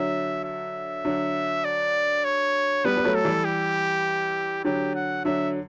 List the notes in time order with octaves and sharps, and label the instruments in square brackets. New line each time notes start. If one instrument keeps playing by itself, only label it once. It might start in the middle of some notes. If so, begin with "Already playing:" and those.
Already playing: [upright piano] D3 F#3 [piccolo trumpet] E5
[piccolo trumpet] E5
[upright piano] D3 F#3
[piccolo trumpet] D5
C#5
[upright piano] G3 B3 [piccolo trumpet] B4
[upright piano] G3
F#3 A3
[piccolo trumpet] A4
[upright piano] E3 G3
[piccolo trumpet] G4
[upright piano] D3 F#3 [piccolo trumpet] G4
[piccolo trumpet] F#5
[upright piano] D3 F#3 [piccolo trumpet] E5